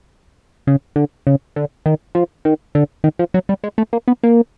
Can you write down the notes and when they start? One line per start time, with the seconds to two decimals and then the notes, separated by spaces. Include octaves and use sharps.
0.67 C#3
0.96 D3
1.27 C#3
1.56 D3
1.86 D#3
2.15 F3
2.45 D#3
2.75 D3
3.04 D#3
3.19 F3
3.34 F#3
3.49 G3
3.64 G#3
3.78 A3
3.93 A#3
4.08 B3
4.23 A#3